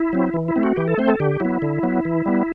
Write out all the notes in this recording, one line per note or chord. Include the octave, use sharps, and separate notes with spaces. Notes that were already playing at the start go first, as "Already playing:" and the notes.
Already playing: E4
F#3 C4
E3
E4
A3 C4
F#4
E3 G4
A4
A3 C4 C5
A4
D3 G4
F#3 B3 E4
D3
F#3 B3
E3
G3 B3